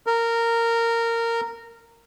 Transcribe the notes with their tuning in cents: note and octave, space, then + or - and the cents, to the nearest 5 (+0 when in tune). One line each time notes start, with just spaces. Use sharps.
A#4 -15